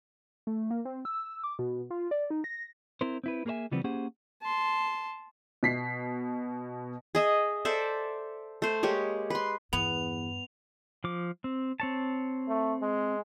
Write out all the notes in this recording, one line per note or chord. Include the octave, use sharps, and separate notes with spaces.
A3
A#3
C4
E6
D6
B2
F4
D5
D#4
A#6
C4 E4 A#4 C5
C4 E4 B4
A#3 G#4 A#4 C#5 E5 G#5
C#3 E3 F3 G3 B3 C4
A#3 C#4 G4 G#4 C5 F#5
A5 C6
B2 B6 C7
G#4 D#5 E5
A4 C5 D5 E5
A3 C5
G#3 A#3 G4 C#5
B4 C6
E2 G2 B3 F7
F3 D6
C4
C4 C#5 A5
A3
G#3